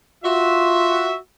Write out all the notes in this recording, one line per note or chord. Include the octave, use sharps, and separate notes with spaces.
F4 F#4 E5